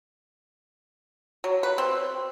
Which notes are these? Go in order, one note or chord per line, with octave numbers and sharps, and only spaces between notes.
F#3
B4
C4